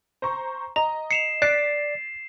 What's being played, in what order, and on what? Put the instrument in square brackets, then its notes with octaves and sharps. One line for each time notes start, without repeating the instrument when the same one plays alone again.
[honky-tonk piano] C5 A#5 C#6
[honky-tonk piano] D#5 [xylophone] A#5
[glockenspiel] C7 E7 [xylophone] C#7 F7
[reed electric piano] D5 [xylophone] F#6 [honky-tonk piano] A6 B6 D7 [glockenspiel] C7